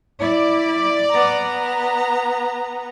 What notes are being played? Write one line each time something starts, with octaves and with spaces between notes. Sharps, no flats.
E4 D5
B3 A#5